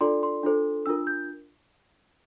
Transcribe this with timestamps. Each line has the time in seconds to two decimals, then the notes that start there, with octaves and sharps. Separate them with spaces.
0.01 D4 F4 A4 D5 C6
0.23 C6
0.43 D4 F4 A4 C5
0.86 D4 F4 A#4 E6
1.07 G6